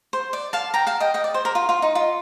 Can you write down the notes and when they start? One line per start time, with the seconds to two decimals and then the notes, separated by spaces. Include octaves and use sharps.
0.13 C5
0.33 D5
0.53 F5 A5
0.74 G5 A#5
0.87 F5 A5
1.00 D#5 G5
1.14 D#5 G5
1.24 D5
1.34 C5
1.45 A#4
1.55 F4
1.69 F4
1.82 D#4
1.95 F4